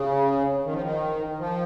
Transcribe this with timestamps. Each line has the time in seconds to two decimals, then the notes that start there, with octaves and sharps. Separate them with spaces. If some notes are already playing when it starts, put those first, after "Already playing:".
Already playing: C#3
0.65 D#3
0.73 F3
0.83 D#3
1.39 F3